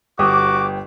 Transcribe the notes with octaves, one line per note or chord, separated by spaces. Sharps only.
G1 F#4 G4 D6 D#6